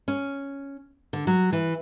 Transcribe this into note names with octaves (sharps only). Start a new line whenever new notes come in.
C#4
D3
F#3
E3